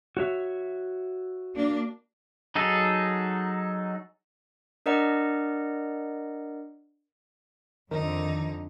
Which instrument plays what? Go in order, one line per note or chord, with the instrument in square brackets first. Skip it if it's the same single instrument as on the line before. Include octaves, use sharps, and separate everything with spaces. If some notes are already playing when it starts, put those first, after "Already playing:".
[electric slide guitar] F#4 C#5 E5
[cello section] A#3 D4
[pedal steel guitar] F#3 D#4 G#4 A4
[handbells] D4 A#4 D5 D#5 F#5 A#5
[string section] F2 D3 [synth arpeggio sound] D#3 [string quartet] D#4